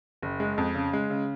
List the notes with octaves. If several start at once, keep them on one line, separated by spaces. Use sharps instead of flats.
F#1
G#3
F2
C#3
G#3
C#3